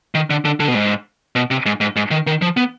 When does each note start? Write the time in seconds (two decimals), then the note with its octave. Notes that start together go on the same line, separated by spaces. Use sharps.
0.15 D#3
0.30 D3
0.45 D3
0.60 D3
0.68 B2
0.75 G#2
1.36 B2
1.51 C3
1.66 G#2
1.81 G#2
1.96 G#2
2.11 D#3
2.27 D#3
2.42 F3
2.57 B3